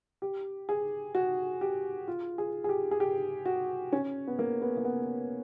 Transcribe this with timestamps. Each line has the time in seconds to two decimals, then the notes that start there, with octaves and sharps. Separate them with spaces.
0.22 G4
0.69 G#4
1.15 F#4
1.61 G4
2.08 F4
2.38 G#4
2.64 G#4
2.69 G4
2.91 G#4
3.00 G4
3.46 F#4
3.92 C#4
4.27 B3
4.39 A#3
4.62 B3
4.77 A#3
4.85 B3